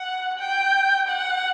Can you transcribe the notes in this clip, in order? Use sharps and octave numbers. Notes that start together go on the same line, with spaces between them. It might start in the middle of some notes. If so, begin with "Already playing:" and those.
Already playing: F#5
G5
F#5